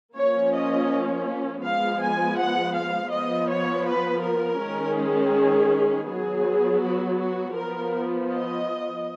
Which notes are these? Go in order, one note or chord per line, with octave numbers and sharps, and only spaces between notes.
F3 A#3 C#4 C#5
D#5
F3 G#3 B3 F5
G#5
F#5
F5
F3 B3 D#5
C#5
B4
A#4
D#3 G#3 C#4
G#4
F#3 B3 G#4
F#4
F#4
F3 B3 A#4
D#5